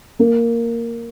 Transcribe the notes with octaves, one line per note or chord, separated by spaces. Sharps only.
A#3